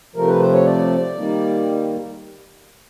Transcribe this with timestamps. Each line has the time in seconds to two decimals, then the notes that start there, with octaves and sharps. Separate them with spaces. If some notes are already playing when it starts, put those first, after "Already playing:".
0.16 C3 F3 A3 A#4
0.28 B4
0.40 C5
0.53 C#5
0.66 D5
1.16 D#3 G3 A#3